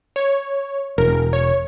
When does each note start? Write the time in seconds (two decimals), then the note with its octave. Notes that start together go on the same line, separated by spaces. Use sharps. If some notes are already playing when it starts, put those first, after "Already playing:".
0.16 C#5
0.98 E1 A#4
1.33 C#5